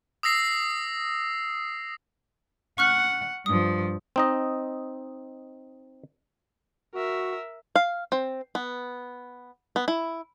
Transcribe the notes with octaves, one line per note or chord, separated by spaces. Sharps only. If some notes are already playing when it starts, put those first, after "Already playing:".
D#6 E6 A#6 C7
F#5 C#6 F6 F#6
G2 F3 D#6
C4 D#4 D#5
F#4 A#4 E5
F5
C4
B3
B3
E4